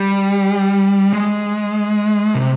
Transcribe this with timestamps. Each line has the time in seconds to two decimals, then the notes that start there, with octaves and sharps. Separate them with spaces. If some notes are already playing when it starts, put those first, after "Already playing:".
Already playing: G3
1.13 G#3
2.35 C3